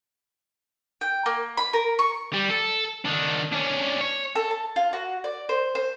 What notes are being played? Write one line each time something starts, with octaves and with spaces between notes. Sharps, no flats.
G5
A#3
B5
A#4
C#6
G3
A4
D#3 D4
C#4 D4
C#5
A4
A5
F4
F#4
D5
C5
C5